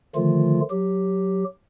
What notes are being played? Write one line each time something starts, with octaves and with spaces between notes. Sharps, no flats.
D3 D#3 F3 A3 F4
F#3 G4